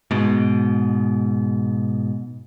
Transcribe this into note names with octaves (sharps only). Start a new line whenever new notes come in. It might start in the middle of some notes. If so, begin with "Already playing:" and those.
G#2 B2